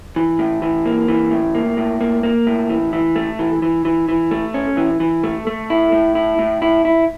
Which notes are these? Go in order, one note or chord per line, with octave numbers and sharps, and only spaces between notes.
E3
A2
E3
A#3
E3
A2
A#3
A2
A#3
A#3
A2
E3
E3
A3
E3
E3
E3
E3
A3
C#4
E3
E3
A3
A3
E4
A2
E4
A2
E4
E4